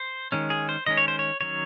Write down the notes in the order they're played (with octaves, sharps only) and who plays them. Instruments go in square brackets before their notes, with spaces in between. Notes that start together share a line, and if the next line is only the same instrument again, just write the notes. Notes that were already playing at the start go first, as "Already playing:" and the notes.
Already playing: [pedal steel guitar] C5
D#3 G#3 C#4
G#4
C5
D#3 G#3 C#4 D#5
C#5
C5
C#5
D#3 F#3 C#4 C#5